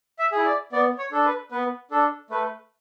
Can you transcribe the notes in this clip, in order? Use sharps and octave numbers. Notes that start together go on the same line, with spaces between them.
E5
G#4
E4
D5
B3 D5
C#5
D4 A4
B4
B3 B4
D4 A4
A3 B4